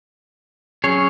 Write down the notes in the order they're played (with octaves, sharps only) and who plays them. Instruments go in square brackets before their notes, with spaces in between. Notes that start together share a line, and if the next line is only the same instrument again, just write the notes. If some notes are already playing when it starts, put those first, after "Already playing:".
[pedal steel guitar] F#3 C#4 G#4 C#5